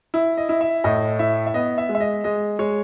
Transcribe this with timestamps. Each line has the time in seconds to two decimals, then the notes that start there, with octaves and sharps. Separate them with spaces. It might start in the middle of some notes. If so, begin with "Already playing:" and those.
0.14 E4
0.37 D#5
0.49 E4
0.61 E5
0.84 A2 D#5
1.19 E4 E5
1.46 E5
1.54 B3 D#5
1.78 E5
1.89 G#3
1.95 E5
2.00 D#5
2.24 G#3 D#5
2.59 G#3 C#5